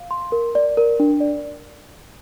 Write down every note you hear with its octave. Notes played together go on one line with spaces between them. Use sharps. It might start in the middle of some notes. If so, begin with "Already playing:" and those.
Already playing: F5
C6
A#4
D5
A#4
D4
D5